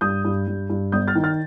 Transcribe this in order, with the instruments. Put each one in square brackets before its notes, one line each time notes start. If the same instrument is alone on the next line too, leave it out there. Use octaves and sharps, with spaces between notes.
[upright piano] G2 D#6 G6
G2
G2
G2
G1 D#6 G6
F6 A6
D#3
F6 A6